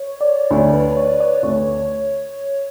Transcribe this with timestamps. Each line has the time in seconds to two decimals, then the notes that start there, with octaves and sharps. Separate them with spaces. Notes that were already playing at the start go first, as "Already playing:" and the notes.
Already playing: C#5
0.21 D5
0.51 D2 D3 A3 C#5
0.73 B4
0.97 C#5
1.20 D5
1.43 D2 D3 A3 C#5